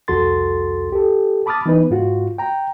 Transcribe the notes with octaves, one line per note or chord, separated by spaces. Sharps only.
C2 F2 F#4 A4 C6 A6
G4 A4
A5 B5 D6 D#6 F6 A6
E3 B3 D#4 B4
G#2 F4 F#4
G5 A#5